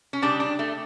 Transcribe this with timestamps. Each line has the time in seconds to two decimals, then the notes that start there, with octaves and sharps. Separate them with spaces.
0.13 C#4
0.22 C#3 G3 D4
0.40 D4
0.59 A3